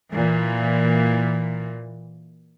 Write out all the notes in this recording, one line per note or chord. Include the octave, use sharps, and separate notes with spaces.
A#2 E3